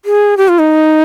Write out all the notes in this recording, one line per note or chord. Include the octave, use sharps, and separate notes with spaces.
G#4
G4
F4
D#4